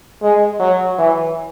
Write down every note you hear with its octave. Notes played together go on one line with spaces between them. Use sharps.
G#3
F#3
E3